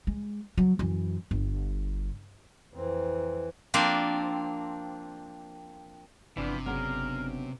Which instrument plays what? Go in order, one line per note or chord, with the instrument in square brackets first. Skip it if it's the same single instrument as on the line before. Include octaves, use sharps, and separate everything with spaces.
[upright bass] G#3
F#3
F#2 E3
G1
[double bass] F2 C4 [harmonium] E3
[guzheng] F3 A#3 C4 D4
[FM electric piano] G1 D4 [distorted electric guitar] C3 [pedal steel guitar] E3 F3 B3
[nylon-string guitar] C#3 F#3 B3 [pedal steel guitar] A#4